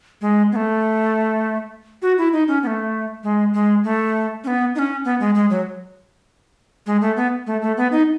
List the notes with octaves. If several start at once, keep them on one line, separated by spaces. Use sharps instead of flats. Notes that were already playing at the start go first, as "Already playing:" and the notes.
G#3
B3
A3
F#4
E4
D#4
C#4
B3
A3
G#3
G#3
A3
C#4
B3
D#4
C#4
B3
G#3
G#3
F#3
G#3
A3
B3
A3
A3
B3
D#4